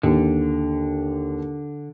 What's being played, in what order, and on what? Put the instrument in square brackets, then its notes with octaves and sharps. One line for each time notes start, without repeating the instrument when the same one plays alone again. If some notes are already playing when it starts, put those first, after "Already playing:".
[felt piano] D#2 [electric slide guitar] D3